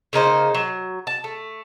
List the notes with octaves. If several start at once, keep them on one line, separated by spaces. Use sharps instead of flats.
C#3 A#3 D#4 C5
F#3
A5
A3